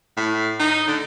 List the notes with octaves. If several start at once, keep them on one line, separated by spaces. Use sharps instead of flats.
A2
D#4
D3